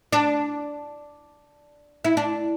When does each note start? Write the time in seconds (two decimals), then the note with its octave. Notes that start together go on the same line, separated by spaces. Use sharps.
0.13 D4
2.04 E4
2.17 D4